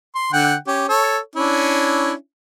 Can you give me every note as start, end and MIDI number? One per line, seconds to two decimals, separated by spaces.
0.15 0.32 84
0.33 0.55 50
0.33 0.55 78
0.33 0.55 79
0.67 0.87 61
0.67 0.87 67
0.89 1.18 69
0.89 1.18 73
1.36 2.13 61
1.36 2.13 62
1.36 2.13 64